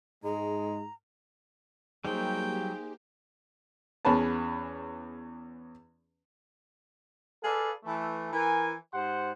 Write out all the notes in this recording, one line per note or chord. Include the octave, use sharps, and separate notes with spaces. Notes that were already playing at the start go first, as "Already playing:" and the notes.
G#2 G#3 G#4 A#5
F#3 G3 A#3 D#4 G4 G#4 C5 G5
E2 C#4 G#4 B4 A5
G#4 A4 B4 D5 F5
E3 A3
E3 A#4 G#5
G#2 G4 C5 F#5 C6